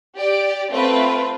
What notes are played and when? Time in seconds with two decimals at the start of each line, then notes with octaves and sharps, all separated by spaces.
0.16 G4 D5
0.69 A3 C4 F4 B4